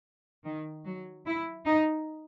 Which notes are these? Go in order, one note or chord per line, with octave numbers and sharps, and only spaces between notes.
D#3
F#3
E4
D#4